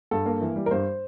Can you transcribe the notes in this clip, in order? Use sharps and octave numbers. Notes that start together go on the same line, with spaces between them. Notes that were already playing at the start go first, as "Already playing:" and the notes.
G2 A4
A#3
E3
G3
A#4
G2 C5